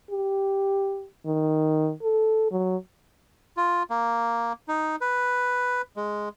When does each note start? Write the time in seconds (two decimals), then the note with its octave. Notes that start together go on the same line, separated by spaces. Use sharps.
0.10 G4
1.26 D#3
2.03 A4
2.51 F#3
3.57 F4
3.90 A#3
4.68 D#4
5.01 B4
5.96 G#3